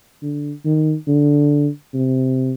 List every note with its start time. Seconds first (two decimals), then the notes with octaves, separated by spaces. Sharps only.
0.22 D3
0.65 D#3
1.07 D3
1.94 C3